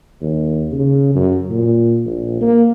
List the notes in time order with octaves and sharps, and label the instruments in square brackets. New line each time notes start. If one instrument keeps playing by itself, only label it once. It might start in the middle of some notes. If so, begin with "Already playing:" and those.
[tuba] D#2
C#3
F#2
A#2
A#1
A#3